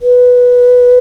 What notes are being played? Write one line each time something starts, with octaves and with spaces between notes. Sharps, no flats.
B4